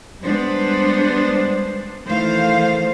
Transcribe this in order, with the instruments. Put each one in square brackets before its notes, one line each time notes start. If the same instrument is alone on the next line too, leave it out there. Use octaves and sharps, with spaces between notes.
[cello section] G3 G#3 B3 D4 C5
D#3 E3 A3 C5 F5